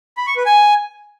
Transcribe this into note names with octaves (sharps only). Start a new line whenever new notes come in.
B5
C#6
B4
G#5